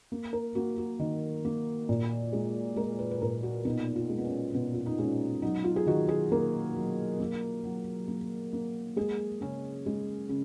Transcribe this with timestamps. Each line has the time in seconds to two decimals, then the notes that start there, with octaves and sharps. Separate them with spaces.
0.12 A#3
0.33 A#4
0.55 A#3 F#4
0.78 F#4
0.99 D#3
1.45 A#3
1.89 A#2
2.33 G#3
2.76 G#3 A#4
2.99 B4
3.11 B4
3.22 A#2 A#4
3.43 F#4
3.65 B2 D#4
3.96 F4
4.10 G#3
4.18 B3
4.25 C#4
4.54 B2 B3
4.74 F4
4.86 D#4
4.98 G#3 C#4
5.42 F#3 D#4
5.64 F4
5.76 G#4
5.87 D#3 F#4
6.09 G#4
6.32 A#3 A#4
6.76 F#3
7.20 A#3
7.64 F#3
8.08 A#3
8.53 A#3
8.96 G#3 G#4
9.41 C#3 C#4
9.86 G#3
10.29 C#3